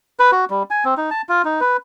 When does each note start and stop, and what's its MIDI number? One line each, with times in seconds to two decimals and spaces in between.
0.19 0.31 71
0.32 0.45 66
0.50 0.63 55
0.70 0.84 80
0.85 0.94 60
0.97 1.10 63
1.11 1.22 81
1.29 1.42 65
1.45 1.60 63
1.61 1.77 71